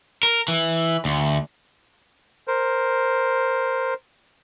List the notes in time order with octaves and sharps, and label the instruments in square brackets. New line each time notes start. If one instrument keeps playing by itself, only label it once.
[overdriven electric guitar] A#4
E3
D2
[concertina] A#4 C5